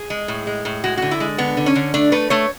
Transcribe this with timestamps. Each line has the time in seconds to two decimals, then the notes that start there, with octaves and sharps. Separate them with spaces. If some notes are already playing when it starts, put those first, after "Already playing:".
Already playing: G#4
0.10 G#3
0.28 A2
0.47 G#3
0.65 A2
0.84 G#3 F#4
0.97 D3 F#4
1.11 E4
1.20 G#3
1.38 D3 B3
1.57 D3
1.66 C#4
1.75 D3
1.94 A3 D4
2.12 A3 B4
2.30 A3 C#5